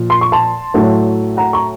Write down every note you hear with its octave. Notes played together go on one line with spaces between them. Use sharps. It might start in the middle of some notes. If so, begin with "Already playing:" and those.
Already playing: A#2 F3
C6
C#6
A5 C6
A2 F#3 A3
F#5 A#5
A#5 C#6